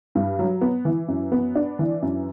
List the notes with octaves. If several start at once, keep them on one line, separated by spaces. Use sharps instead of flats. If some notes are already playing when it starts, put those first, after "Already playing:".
G2
F#3
B3
E3
F#2
B3
D4
E3
F#2